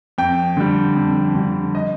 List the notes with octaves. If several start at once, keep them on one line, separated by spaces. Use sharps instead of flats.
F2 G5
D3 G3
F2
D3 G3
D#5